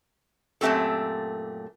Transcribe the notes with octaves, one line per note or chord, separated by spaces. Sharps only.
F#2 A#2 A3 C4 G4 A4